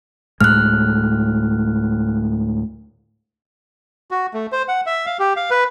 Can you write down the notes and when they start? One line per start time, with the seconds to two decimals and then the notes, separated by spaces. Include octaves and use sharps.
0.41 D2 A2 G#3 F6 F#6
4.11 F#4
4.34 A3
4.52 C5
4.68 F#5
4.86 E5
5.06 F5
5.19 G4
5.37 F5
5.51 B4